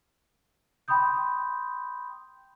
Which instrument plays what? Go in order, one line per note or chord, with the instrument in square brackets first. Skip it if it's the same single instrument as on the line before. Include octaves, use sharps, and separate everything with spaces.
[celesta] G5 B5 C6 D#6 G6